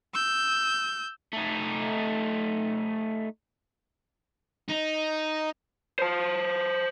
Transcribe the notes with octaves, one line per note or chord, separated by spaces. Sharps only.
E6 G6
A3 D#4
D#4
C5 A5